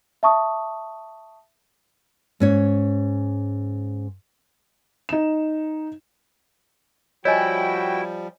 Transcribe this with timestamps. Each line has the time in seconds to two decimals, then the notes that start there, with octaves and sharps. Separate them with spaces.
0.23 E5 A5 C#6 D#6
2.40 G#2 C#4 C#5
5.09 D#4 E7
7.25 F3 G3 E4 F#4 C#5 D#5 G5 G#5